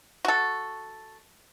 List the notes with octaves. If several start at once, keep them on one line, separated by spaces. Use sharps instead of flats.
F#4 A4